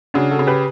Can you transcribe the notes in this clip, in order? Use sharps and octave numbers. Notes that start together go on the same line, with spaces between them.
C#3 D4 F#4
F#4 A4
C#3
G4 B4